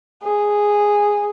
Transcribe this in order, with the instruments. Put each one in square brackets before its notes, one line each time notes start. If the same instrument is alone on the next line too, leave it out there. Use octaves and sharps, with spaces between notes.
[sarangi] G#4